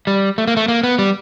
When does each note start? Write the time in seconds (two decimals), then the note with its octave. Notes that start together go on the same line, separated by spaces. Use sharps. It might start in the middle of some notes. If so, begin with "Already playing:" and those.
0.07 G3
0.38 A3
0.47 A#3
0.57 A3
0.68 A#3
0.83 B3
0.99 G3